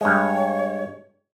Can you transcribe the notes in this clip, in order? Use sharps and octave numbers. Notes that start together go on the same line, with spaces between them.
G2 G#3 C#5